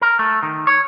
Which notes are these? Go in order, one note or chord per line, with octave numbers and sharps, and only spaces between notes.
A#4
A3
D#3
C#5